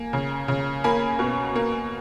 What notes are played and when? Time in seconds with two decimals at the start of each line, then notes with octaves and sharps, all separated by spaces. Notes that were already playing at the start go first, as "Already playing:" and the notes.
Already playing: A#3 G#5
0.13 C#3
0.48 C#3
0.84 A#3 G#5 B5
1.19 B2
1.55 A#3